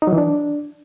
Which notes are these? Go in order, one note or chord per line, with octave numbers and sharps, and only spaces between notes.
D#4
F#3
E3
D4